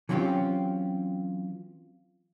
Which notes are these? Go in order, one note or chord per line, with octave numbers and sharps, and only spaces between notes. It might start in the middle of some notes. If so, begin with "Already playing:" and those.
E3 F#3 C4 C#4 F4 G4